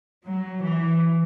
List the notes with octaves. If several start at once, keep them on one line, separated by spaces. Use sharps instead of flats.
F#3
E3